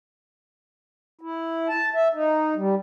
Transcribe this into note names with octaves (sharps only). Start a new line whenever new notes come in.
E4
A5
E5
D#4
G3